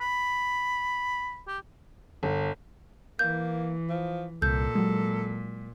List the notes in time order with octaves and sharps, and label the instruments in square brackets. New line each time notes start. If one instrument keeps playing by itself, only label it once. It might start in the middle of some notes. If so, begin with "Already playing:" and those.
[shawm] B5
G4
[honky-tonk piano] G1
[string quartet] E3 [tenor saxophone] A#3 [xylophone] G6
[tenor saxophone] F3
[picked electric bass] C2 [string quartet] A#2 [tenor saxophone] A4 [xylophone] G6
[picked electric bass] F#3 G#3